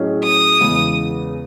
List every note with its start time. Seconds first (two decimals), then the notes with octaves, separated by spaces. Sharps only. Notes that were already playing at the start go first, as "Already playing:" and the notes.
Already playing: A2 F#3 C#4 G#4 D#5
0.24 D#6
0.61 E2 C#3 E3 G#3